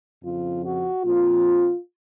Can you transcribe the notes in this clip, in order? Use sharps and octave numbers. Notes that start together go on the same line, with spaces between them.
F2 C#3 F3 F4
F#4
A#2 F3 C4 F4